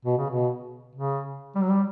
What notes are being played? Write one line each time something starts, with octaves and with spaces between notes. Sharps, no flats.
B2
C#3
B2
C#3
G3
F#3
G3